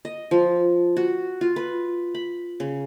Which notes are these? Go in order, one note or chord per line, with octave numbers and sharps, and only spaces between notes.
D#5
F3
F#4
F4
B4
B5
C#3